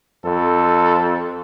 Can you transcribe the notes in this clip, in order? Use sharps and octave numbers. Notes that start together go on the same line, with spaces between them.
F2 A4